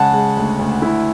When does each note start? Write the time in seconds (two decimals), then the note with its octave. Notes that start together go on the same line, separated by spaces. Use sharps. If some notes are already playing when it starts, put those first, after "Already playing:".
Already playing: C#3 G#3 F#5 A5
0.13 G#3
0.37 D2
0.59 D2
0.82 E4